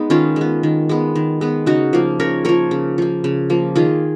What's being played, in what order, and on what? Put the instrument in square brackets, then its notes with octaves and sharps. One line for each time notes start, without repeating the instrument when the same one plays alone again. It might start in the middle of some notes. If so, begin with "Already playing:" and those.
Already playing: [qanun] G#3 B3 D#4
D#3 C#4 F4
G#3 B3
D#3
G#3 B3
D#3
G#3 B3
C#3 D#4 F#4
F3 A#3
C#3 A#4 C#5
F3 A#3 A#4 C#5
C#3
F3 A#3
C#3
F3 A#3
D#3 F4 G#4